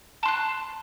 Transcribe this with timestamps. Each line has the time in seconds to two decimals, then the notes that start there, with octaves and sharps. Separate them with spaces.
0.23 A5
0.25 C6
0.28 F#6